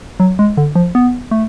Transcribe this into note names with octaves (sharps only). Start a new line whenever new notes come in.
F#3
G#3
D3
F3
B3
A3